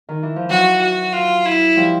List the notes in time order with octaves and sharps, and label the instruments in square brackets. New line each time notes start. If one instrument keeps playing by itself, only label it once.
[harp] D#3
E3
F3
[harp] E3 F#3 [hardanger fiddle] F#4
[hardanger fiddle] F#4
F4
E4
[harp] F3 G3